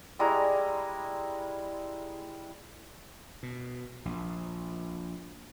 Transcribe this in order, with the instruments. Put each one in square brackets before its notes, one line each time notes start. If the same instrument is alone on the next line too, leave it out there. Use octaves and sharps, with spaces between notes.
[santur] G3 G#3 E4 A#5
[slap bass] B2
A#1 A#2